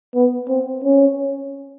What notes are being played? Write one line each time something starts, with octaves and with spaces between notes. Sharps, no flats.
B3
C4
C#4